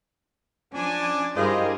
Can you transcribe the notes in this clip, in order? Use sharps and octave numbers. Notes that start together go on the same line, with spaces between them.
F3 C#4 D4 D5 G#5
G2 E4 F4 G4 G#4 A#4 C5 D#5